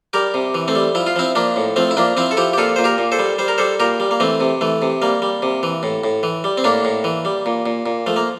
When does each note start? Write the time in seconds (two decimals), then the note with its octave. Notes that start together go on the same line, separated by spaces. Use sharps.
0.13 G3 G4 A#4
0.34 C3
0.54 E3
0.68 A3 C4
0.75 G3
0.95 F3 E4
1.07 F4
1.16 F3 C4 E4
1.35 F3 A#3 D4
1.56 A2
1.76 F3 A3 C4
1.91 E4
1.97 F3 A#3 D4
2.17 F3 C4 E4
2.31 A4
2.37 F3 E4 G4
2.53 G4
2.58 A#2 F4 A4
2.76 A#2 C5
2.84 G4 A#4
2.98 A#2
3.12 A4 C5
3.19 G3
3.38 G3 C5
3.48 A#4
3.58 G3 A4 C5
3.80 A#2 G4 A#4
4.00 G3
4.11 A#3
4.20 E3 A3 C4
4.40 C3
4.61 E3 A3
4.82 C3
5.02 G3 A#3
5.22 G3
5.42 C3
5.63 E3
5.83 A2
6.04 A2
6.23 E3
6.44 G3
6.58 C4
6.64 A2 A#3 D4
6.85 A2
7.04 E3
7.25 G3
7.46 A#2
7.66 A#2
7.86 A#2
8.07 F3 A3
8.16 A#3